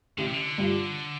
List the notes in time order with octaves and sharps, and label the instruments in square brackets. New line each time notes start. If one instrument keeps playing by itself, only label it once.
[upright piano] A1 [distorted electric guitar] D3
[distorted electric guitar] C3
D3
[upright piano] G2 G3 F4